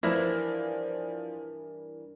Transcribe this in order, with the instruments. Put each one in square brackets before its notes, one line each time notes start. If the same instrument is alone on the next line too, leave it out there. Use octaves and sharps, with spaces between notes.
[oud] G2 E3 D4 [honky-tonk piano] F3 F6 A#6 [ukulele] E4 [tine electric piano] A#4